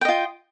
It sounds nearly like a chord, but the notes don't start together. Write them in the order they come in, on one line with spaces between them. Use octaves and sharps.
G5 D#5 F4